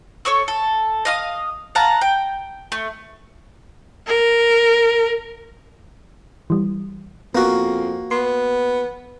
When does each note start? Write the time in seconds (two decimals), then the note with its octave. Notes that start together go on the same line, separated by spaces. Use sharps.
0.25 A4 C#5 C#6 E6
0.48 A4
1.05 D#5 F5 D#6
1.75 F5 F#5 A5 A#5
2.01 G5
2.72 A3
4.07 A#4
6.50 E3 G3
7.35 F2 A#3 B3 F#4
8.11 B3 C6